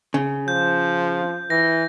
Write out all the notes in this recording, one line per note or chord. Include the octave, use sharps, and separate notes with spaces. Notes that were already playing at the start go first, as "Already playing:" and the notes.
C#3
F3 G6
E3 A#6